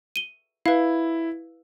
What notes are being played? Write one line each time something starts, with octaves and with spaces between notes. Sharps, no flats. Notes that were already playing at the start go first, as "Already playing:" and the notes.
D#7 G7
E4 B4 F5